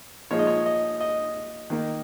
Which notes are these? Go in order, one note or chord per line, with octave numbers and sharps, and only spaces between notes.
A#2 F3 G#3 D#4 C#5
D#5
C#5
D#5
D#5
D#3 A#3 D#4